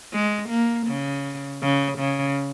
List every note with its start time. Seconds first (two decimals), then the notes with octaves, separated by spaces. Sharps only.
0.13 G#3
0.50 A#3
0.88 C#3
1.62 C#3
1.99 C#3